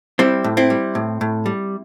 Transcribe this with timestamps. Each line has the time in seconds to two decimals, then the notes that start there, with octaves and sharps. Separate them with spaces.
0.19 G3 C4 E4
0.44 A2
0.57 C4 E4
0.70 G3
0.95 A2
1.21 A2
1.46 G3